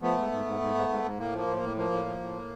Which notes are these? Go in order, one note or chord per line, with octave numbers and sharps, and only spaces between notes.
F3 A3 B3
G#2
G#2
G#2
G#2
G#2
G#2
G#2
A2 A#3
F3
A#3
A2
A#3
A2
F3 A#3
A2
F3
A2